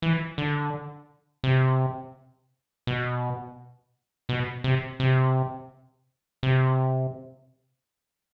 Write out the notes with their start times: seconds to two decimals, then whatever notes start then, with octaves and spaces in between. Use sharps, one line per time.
0.02 E3
0.38 D3
1.44 C3
2.87 B2
4.29 B2
4.64 C3
5.00 C3
6.43 C3